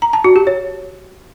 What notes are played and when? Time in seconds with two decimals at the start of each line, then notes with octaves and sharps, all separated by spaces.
0.02 A#5
0.13 A5
0.24 F#4
0.36 G4
0.47 C#5